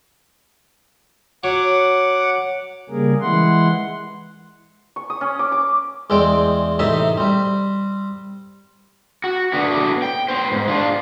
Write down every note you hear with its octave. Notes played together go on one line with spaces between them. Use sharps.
F#3 F#5 D6
C#3 G3 A#3 G#4 A#4
E3 G#3 E4 F#5 C6
C#6
D#6
C#4
D6
D6
E2 G#3 C4 D5 G5
A1 C3 D#4 E5 C6 D#6
G3 C4
F#4
A3 B3 D4 F#4
G5
B3 C5
G#2
D4 F4